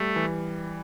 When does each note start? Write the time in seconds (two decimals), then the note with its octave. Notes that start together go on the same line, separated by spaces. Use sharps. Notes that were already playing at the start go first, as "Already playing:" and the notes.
Already playing: G3 A3
0.16 E3